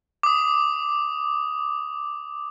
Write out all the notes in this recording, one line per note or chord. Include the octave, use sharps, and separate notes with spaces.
D6 D#6